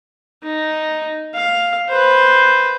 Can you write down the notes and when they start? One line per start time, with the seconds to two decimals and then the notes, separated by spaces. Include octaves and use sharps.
0.43 D#4
1.35 F5
1.89 B4 C5